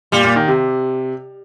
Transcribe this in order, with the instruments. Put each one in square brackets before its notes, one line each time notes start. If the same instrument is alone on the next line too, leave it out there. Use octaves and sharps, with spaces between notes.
[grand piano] A#2 [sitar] G3
[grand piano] A#2
D#3
C3